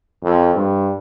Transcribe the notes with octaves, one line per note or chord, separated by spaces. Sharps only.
F2
G2